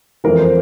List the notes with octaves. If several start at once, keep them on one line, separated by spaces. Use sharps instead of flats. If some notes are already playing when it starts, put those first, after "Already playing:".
F2 E3 A#4
C5